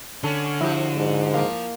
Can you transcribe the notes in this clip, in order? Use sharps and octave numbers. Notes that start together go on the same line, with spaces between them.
D3 C#4 A4
F3 E4 F#4 G4
G#2
F3 A#3